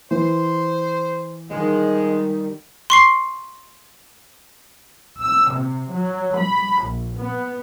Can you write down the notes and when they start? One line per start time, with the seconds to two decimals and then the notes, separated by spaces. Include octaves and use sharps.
0.11 E3 C5
1.50 D#3 F3 G3 G#3
2.90 C6 C#6 C7
5.21 E6
5.52 C3
5.92 F#3
6.38 B5
6.84 A#1
7.17 B3